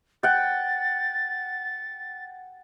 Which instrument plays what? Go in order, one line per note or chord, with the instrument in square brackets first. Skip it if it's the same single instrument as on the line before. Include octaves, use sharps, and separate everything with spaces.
[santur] F#5 G5 [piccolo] A6